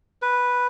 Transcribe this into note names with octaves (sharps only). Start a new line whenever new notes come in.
B4